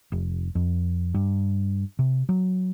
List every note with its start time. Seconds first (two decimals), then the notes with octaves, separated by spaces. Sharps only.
0.12 F1
0.55 F2
1.14 G2
1.99 C3
2.29 F#3